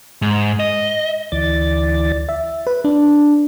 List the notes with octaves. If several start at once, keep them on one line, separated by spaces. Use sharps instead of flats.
G#2
D#5
D2 E3 D5 A6
E5
B4
D4